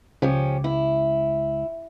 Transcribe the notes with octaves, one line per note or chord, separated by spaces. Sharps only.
C#2 F3 C#4 G4
E4